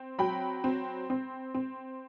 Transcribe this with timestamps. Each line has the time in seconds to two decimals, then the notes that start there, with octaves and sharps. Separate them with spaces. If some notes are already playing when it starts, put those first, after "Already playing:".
Already playing: C4
0.18 F#3 G5 B5
0.64 C4
1.10 C4
1.54 C4